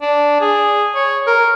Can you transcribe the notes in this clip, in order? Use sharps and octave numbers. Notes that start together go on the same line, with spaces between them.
D4
G#4
C#5
A#4